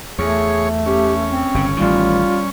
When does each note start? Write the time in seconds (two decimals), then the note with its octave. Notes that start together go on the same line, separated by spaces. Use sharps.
0.19 E2 A3 G#4 C#5
0.86 C#4 G4
1.30 C4
1.54 G1 C#3
1.77 A1 D#3 G3 F4